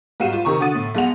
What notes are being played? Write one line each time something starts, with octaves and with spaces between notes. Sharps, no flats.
G#2 G3 F#4 F5 D#7 E7
F4
C3 D#3 A#5 C#6
D3 F#4 F#5 D#6 A6 D#7
A2
B1 G#3 F#5 F7